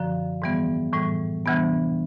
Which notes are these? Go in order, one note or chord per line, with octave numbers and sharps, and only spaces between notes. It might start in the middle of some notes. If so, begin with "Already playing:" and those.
Already playing: F#2 D3 F3
G#2 E3 G3 B3
A2 E3 G3
D2 C3 E3 G3 B3